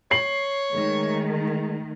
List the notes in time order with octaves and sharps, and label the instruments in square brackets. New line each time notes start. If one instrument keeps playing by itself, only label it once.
[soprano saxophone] C#5 [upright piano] C7 F#7
[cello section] D#3 A3 [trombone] G#3